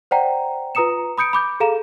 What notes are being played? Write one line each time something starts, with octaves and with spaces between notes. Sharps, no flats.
C5 D5 F#5 G5 A#5
F4 B4 A#5 D#6 C#7 E7
B5 D#6 G6 C#7 D7
B5 D6 G6
G#4 A4 F5 A#5 E7